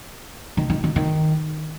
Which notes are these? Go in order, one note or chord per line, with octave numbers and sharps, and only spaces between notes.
D#3
D#3
D#3
D#3